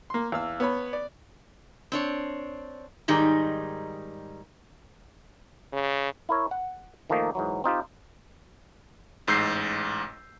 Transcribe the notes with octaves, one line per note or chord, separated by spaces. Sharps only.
A#3 C6
E2 F5 E6
B3 C#5 B5
D5
C4 D4 C#5
G#2 D#3 G3 D#4 G#4
C#3
E4 A#4 C#5
F#5
D#3 F3 A3 A#3 D#4
G#2 E3 F#3
C4 D#4 F4 G4
A1 G#2 E6 G6 C7